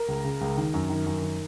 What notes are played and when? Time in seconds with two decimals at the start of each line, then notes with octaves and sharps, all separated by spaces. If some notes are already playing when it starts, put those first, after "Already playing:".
Already playing: A#4
0.08 C#2
0.24 C#3
0.41 C#2
0.57 D#3
0.74 F#2
0.89 D#3
1.06 F#2
1.22 D#3